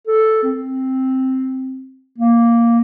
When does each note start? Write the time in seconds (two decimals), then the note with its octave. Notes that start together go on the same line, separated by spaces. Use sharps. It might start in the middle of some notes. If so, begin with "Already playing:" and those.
0.07 A4
0.43 C4
2.18 A#3